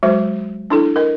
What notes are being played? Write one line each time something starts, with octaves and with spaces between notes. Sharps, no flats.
F#3 G#3 F#4 C5
D4 E4 A4
A#4 D#5